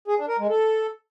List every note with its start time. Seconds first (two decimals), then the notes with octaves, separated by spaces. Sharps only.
0.08 G#4
0.18 D4
0.29 A#4
0.39 G#3
0.49 A4